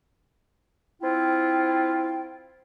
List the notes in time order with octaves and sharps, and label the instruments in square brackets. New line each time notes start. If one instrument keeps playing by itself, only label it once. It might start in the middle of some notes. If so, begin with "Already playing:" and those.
[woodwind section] C4 E4 F4 G5